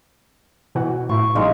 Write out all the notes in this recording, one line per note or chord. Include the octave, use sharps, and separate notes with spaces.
B2 E3 F#4
A2 E4 C#6
A#1 G2 G#3 D#4 F5